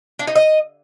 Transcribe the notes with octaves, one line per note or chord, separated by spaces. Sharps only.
D4
D#4
D#5